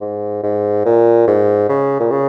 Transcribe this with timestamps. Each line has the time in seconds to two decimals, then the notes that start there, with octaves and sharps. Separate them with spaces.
0.01 G#2
0.43 G#2
0.86 A#2
1.27 G#2
1.69 C#3
2.00 A#2
2.11 C#3